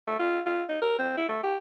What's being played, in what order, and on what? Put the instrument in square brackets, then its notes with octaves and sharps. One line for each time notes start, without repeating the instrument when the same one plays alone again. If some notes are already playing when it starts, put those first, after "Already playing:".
[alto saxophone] A3
F4
F4
D#4
A#4
C4
E4
A3
G4